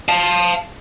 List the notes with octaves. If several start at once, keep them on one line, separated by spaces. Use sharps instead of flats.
F5 A5